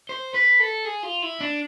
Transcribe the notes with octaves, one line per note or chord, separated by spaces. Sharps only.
C5
B4
A4
G#4
F4
E4
D4